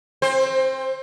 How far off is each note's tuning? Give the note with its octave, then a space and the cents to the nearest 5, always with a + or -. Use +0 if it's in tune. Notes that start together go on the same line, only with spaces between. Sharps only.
C4 +30 C5 +10